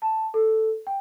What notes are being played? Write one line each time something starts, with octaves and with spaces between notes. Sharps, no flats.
A5
A4
G5